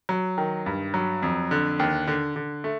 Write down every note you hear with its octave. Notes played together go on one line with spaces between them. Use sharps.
F#3
D#3
G2
F#3
F2
D3
D#2
D3
D3
A3